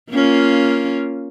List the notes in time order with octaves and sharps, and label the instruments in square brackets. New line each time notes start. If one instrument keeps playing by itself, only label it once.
[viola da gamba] A#3 C#4 F4